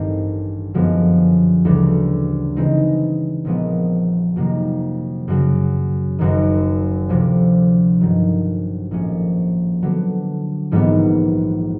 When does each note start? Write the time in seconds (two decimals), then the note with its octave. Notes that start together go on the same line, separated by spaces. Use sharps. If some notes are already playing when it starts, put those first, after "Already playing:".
Already playing: A1 G2 D#3 G3 C4
0.74 F#2 D3 F3 G#3 B3
1.65 D2 C#3 E3 G3
2.56 C#3 E3 G#3 C4 D#4
3.45 A#1 A#2 F3 G#3 B3
4.36 F2 C3 D#3 F#3 A#3
5.28 F#2 C#3 F#3
6.19 F#1 F#2 D#3
7.09 D2 C3 F3
8.00 A1 G2 D#3 F#3
8.91 A#1 A2 F3 G#3 C#4
9.82 D3 F#3 B3
10.71 A#1 G#2 E3 G3 B3